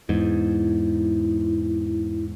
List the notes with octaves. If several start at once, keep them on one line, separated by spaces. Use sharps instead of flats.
E2 G#2 E4